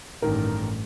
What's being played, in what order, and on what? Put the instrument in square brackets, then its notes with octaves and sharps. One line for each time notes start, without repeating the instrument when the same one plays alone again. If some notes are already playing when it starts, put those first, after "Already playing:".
[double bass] A1 G2 [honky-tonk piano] D#3 A#4